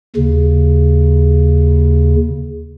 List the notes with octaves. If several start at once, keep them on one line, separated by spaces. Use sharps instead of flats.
D#2 C#3